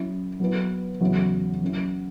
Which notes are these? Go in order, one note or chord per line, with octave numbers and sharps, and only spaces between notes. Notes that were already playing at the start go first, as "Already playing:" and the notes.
Already playing: F#3 C#4 E4
F#3 B3 E4 B4
E2 C#3 F#3 E4
F#3 C#4 E4